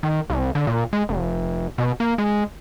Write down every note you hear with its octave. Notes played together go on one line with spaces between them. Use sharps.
D#3
C2
D3
A#2
G#3
F1
B2
A#3
G#3